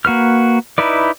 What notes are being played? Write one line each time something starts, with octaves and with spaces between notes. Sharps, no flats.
A#3 F#4 B4 F6
D#4 E4 B4 D5